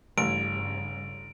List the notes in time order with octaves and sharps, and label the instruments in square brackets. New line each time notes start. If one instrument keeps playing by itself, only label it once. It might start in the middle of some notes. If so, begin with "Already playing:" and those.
[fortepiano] A1 [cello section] G2 C#3 [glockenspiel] D7